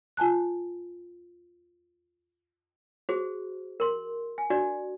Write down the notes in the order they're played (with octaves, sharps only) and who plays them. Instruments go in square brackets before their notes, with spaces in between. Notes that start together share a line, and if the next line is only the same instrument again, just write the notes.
[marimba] F4 G#5 A5 F#6
[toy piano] F#4 G#4 C5
A#4 C6
G#5
D4 F#4 D5